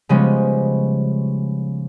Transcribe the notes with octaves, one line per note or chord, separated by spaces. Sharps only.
C#3 F3 G3 G#3 B3 C#4